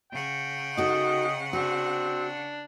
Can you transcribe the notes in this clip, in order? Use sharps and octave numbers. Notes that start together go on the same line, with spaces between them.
C#3 F#5 G5
D#4 F#4 A4 D#5
C4 D4 F#4